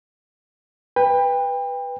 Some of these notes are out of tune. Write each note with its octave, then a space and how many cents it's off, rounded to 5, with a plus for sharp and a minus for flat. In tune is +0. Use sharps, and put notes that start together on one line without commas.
B4 +0 G5 +30